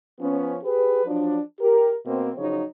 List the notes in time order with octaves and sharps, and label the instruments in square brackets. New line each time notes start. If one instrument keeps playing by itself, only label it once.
[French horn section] F3 B3 C#4
G4 G#4 B4
F3 F#3 D4
G4 A#4
B2 A#3 C4
C#3 F3 F#3 D#4 C#5